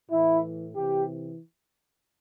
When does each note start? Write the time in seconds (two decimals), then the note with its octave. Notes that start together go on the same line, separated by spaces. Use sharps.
0.11 A2 E3 E4
0.75 C3 E3 G4